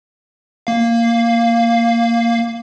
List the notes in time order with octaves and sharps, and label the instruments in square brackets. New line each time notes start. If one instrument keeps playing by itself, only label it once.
[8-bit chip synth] A#3 F5